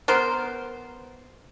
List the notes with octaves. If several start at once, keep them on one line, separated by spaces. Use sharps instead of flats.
B3 A#4 C5